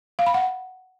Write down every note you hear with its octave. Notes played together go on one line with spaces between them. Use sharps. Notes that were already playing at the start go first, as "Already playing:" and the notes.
F5
B5
F#5